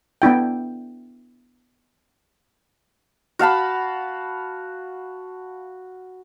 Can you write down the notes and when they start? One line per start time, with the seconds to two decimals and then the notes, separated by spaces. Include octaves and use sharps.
0.22 B3 D4 E4 G5
3.39 F#4 F5 A5 B5